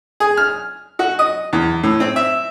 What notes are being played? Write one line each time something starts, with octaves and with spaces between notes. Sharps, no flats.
G#4
F6
F#4
D#5
E2
A2
C4
E5